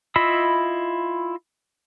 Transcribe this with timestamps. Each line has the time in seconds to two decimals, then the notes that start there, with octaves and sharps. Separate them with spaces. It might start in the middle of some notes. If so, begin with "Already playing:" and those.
0.16 E4 F4 D#5 B5 E6